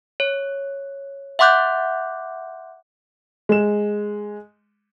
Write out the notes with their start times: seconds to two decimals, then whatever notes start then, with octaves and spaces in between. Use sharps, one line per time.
0.20 C#5
1.39 E5 F#5 C6 D6 F#6 G6
3.49 G#3 E7